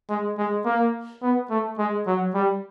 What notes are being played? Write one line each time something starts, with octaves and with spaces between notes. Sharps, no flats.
G#3
G#3
A#3
B3
A3
G#3
F#3
G3